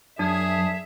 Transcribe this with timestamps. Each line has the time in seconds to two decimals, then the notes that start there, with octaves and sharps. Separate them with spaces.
0.19 F#2 D4 G#4 E5